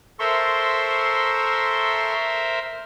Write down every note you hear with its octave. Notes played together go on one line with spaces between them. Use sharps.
A4 A#4 C5 E5 C6 C#6